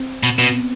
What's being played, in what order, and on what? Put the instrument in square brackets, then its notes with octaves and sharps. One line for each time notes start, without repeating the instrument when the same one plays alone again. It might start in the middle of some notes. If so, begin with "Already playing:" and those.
Already playing: [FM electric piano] C4
[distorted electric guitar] B2
[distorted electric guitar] B2 [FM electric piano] B3